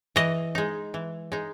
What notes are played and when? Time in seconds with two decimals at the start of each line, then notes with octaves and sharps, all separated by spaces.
0.16 E3 D#5
0.55 G#3 D#4
0.94 E3
1.32 G#3 D#4